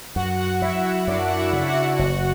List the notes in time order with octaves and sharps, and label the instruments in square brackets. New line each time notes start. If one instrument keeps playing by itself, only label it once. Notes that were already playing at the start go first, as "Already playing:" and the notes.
[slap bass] F#2 [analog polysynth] F#4 F#5
[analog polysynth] F#4 F#5
[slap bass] F#3 [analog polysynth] E4 E5
[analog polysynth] E4 E5
[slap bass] F#2 [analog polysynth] D4 D5
[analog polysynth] F#5
E4 E5
[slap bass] C#3
[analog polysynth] F#4 F#5
[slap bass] F#1 [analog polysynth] F#4 F#5